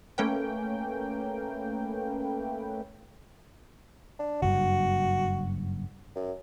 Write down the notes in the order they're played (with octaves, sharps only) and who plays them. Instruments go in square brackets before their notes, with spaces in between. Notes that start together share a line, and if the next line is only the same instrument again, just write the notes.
[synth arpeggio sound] A3 A#3 C#4 B4 G5
[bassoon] D4
[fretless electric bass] F#1 G2 [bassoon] F#4
[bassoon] F#2